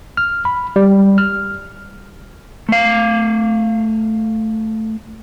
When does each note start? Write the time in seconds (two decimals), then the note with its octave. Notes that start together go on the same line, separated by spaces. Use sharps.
0.17 F6
0.45 B5
0.76 G3
1.18 F6
2.69 A3 F5